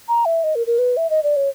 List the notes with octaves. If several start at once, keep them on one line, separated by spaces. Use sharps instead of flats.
A#5
E5
D#5
A#4
A#4
B4
E5
D#5
D5
C#5